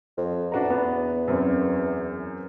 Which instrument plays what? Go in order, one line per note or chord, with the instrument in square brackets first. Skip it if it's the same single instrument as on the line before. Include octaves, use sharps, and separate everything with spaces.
[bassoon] F2
[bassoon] E2 [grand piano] D4 F#4 A#5
[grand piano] B3
F#2 C4 C#4